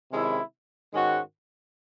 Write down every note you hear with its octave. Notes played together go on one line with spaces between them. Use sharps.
C3 D#3 G#3 C#4 E4
G#2 D#3 G#3 C#4 F#4